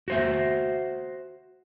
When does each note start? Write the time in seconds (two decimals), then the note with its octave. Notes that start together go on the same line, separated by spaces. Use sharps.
0.08 F#4 C5 E5